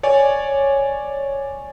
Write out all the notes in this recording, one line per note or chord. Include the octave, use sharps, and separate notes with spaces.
C#5 D5 G#5